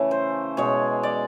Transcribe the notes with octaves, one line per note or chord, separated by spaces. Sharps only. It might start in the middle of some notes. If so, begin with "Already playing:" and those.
Already playing: C#3 E3 A3
C5
B2 G#3 C#5
D5